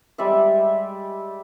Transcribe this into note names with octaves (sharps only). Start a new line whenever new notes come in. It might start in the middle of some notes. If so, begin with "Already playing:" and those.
G3 G#3 D5 E5